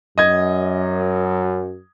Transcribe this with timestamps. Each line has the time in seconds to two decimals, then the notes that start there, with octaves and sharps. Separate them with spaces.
0.18 F#2 D#5 G#6